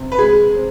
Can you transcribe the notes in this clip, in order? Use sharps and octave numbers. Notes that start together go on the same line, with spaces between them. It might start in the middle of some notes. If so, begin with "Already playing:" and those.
Already playing: C3
B4
G#3 G#4
C4